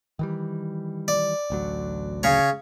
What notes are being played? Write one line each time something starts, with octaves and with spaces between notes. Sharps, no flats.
D#3 E3 G3
D5
A1 D2 F#3
C#3 C#5